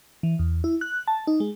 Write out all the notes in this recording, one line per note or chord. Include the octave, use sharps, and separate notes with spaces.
E3
E2
E4
F#6
A5
D#4
G#3